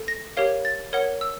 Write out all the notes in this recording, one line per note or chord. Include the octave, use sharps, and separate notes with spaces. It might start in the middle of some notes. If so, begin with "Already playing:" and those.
Already playing: A4
A#6
G4 A#4 C#5 F5
A6
A#4 C#5 F#5
E6